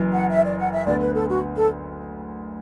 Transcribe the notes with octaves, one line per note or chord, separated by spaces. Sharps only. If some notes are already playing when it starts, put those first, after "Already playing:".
Already playing: F#1 F#2 E3
F#5
E5
D5
F#5
E5
D2 D3 B3 D5
B4
A4
F#4
A4